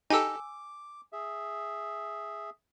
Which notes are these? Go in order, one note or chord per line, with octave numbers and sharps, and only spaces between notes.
D#4 G4 A4 G#5 D6 E6
G#4 E5